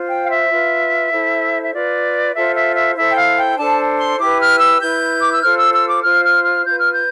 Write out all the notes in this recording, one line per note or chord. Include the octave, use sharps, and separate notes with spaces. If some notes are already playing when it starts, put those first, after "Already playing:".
Already playing: F4 C5
G5
F5
E5
F4 B4
E4 A4 C5
E5
F4 B4 D5
F4 A4 C5 E5
E5
E5
E4 A4 C5 E5
G5
F5
G5
D4 A4 C5 A5
C6
E4 G4 B4 D6
F6
E6
E4 B4 G6
D6
E6
F4 A4 C5 F6
E6
E6
D6
F4 C5 F6
F6
F6
F4 B4 G6
F6
G6